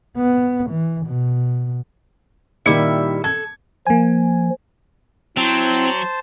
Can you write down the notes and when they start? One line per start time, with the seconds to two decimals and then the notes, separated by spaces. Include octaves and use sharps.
0.18 B3
0.70 E3
1.06 B2
2.66 A#2 D#3 G3 E4 E5 C#7
3.24 A4 G#6
3.87 F3 A#3 G#5
5.37 F#3 C4 E4 C5 A5